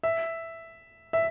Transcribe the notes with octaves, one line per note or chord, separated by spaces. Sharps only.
E5
E5